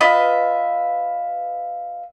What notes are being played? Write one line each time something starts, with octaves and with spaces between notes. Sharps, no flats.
F4 B4 D#5 E5